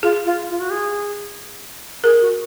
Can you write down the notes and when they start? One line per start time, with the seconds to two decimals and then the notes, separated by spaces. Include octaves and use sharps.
0.03 F4 G#4
0.26 F4
0.50 F4
0.60 F#4
0.70 G#4
2.04 G#4 A#4
2.21 F#4